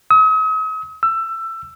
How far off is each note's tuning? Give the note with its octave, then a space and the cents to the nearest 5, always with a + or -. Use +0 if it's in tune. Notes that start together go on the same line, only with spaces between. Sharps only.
D#6 +45
E6 +20